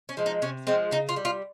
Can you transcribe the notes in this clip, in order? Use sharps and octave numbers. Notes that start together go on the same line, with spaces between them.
C#4
F3 G#3
D#4
C3 C#4
F3 G#3 C4
C#3 D#4
F4
G3
F4